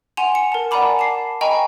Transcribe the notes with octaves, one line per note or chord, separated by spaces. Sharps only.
F#5 G#5 C6 E7 F7
C#7
A#4 A5
D5 F#5 G#5 A#5 B5 D6
A5 D6 C7
D#5 G5 G#5 A#5 B5 C#6